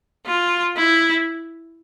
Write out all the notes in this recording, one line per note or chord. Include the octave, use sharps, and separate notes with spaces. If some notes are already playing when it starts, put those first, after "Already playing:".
F4
E4